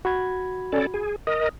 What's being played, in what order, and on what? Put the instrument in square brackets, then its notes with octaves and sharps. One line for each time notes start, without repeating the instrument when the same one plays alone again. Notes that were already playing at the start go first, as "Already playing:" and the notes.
[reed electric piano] F#4 B5 G#6
[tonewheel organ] C#4 A4 D5
G#4
[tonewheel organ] A#4 D#5 [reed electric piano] D#6